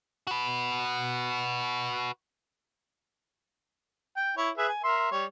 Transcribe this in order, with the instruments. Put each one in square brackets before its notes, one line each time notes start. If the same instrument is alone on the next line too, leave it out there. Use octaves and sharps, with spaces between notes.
[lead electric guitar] F#4 B4
[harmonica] G5
E4 C#5
G#4 B4 E5
G#5
A#4 E5 C6
G3 C#5